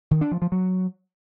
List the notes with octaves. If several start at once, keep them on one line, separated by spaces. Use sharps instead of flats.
D#3
D4
F3
F3
F#3